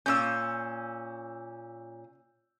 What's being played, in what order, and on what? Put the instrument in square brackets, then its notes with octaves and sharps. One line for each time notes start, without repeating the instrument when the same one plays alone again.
[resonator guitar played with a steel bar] A#2 C#4 [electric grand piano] E6 G6